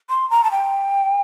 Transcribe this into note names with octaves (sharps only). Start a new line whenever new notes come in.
C6
A#5
A5
G5